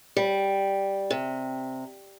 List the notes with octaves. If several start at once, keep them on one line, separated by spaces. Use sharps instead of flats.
G3
C3